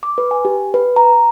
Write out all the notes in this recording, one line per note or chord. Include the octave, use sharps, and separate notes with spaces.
D6
B4
G#5
G4
B4
A#5